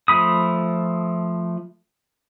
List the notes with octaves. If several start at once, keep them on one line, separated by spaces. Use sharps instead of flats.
F3 A3 B5 D#6